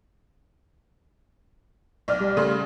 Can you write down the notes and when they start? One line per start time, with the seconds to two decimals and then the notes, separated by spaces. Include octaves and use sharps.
2.08 B1 D5 F6
2.20 G3
2.37 C#3 A3 C6